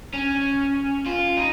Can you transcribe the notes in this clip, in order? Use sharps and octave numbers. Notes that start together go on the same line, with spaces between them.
C#4
F4
D#4